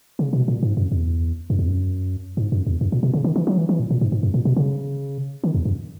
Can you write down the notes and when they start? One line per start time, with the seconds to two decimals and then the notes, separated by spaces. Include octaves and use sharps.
0.19 C#3
0.33 B2
0.48 A#2
0.63 G#2
0.77 F#2
0.92 E2
1.50 F#2
1.59 E2
1.68 F#2
2.37 G#2
2.52 F#2
2.66 E2
2.81 F#2
2.92 A#2
3.03 B2
3.14 C#3
3.24 D#3
3.36 E3
3.47 F#3
3.58 E3
3.69 E3
3.80 A#2
3.90 A#2
4.01 G#2
4.12 G#2
4.23 F#2
4.34 A#2
4.45 B2
4.56 C#3
5.44 D#3
5.54 E2
5.65 F#2